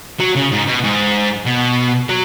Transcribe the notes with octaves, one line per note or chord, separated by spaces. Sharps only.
F#3
C#3
G#2
B2
G#2
B2
F#3